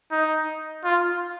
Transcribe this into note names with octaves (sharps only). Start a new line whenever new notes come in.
D#4
F4